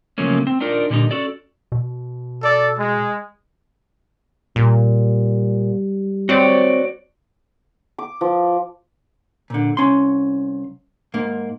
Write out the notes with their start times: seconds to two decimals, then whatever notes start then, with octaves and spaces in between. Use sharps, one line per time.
0.18 C#3 F3 F#3 A3 A#3 C#4
0.47 C4
0.61 D4 D#4 F4 A#4 D5
0.90 A#2 D3 G3 C#4 D#4
1.11 C#4 F#4 A4 D5
1.72 B2
2.41 A4 D5
2.78 G#3
4.56 A#2 G3
6.29 C4 F#4 C#5 D5
7.98 D6
8.21 F3
9.50 A#2 D3
9.77 C2 C#4 C6
11.14 G#2 A#3